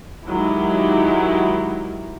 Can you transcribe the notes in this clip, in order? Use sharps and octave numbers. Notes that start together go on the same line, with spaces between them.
D#3 F#3 G#3 E4 G4